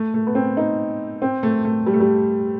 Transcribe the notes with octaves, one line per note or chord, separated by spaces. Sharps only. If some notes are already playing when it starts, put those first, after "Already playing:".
Already playing: A3
A3
B3
C4
D#4
C4
A3
A3
G3
A3
G3